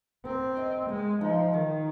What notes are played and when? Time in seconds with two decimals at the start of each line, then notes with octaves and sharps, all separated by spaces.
0.25 C4 A#4
0.57 D#5
0.89 G#3 D#5
1.21 F3 D#4
1.53 D#3 A#4